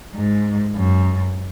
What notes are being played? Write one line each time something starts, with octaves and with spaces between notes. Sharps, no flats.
G#2
F#2